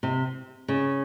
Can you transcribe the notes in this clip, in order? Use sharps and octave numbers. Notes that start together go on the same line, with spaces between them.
C3
C#3